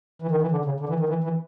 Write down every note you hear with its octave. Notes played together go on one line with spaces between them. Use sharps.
E3
D#3
E3
D3
C#3
D3
E3
D#3
E3
E3